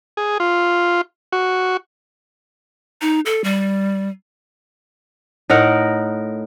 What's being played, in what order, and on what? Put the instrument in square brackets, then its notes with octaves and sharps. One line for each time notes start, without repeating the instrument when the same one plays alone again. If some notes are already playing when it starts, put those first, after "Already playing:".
[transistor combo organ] G#4
F4
F#4
[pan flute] D#4
A4
G3
[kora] A2 D#4 A#4 F#5